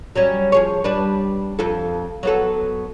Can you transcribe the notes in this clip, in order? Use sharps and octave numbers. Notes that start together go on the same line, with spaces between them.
F#3 G3 C#4
F3 G#4 C#5
G3 D4 B4
F2 F4 A4
F#3 B3 A4